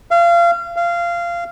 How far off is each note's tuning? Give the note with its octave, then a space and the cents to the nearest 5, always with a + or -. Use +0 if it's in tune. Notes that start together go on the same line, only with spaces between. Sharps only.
F5 -30
F5 -20